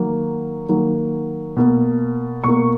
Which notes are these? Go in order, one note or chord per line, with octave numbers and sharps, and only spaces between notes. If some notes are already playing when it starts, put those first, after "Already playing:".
Already playing: D#3 F#3 A#3
D#3 F#3 A#3
B2 A#3
B2 A#3 C#6